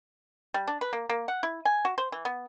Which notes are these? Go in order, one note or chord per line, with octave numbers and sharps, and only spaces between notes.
G3
D4
B4
A#3
A#3
F#5
E4
G#5
F#4
C5
E3
B3